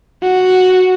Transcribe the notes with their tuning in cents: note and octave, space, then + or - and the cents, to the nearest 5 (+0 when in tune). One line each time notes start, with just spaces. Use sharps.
F#4 +0